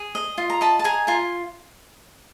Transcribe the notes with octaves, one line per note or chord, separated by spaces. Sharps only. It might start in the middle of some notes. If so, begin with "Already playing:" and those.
Already playing: G#4
D#5
F4
A#5
D#5 A5 B5
A5
G#4 G#5 A#5
F4 G#5 A#5